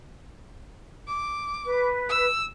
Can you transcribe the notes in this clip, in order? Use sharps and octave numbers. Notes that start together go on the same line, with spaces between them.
D6
B4
E6